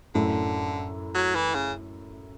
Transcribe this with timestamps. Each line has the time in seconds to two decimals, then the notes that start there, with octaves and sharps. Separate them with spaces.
0.15 F#2 A2 D3
1.14 F#3
1.35 E3
1.54 C#3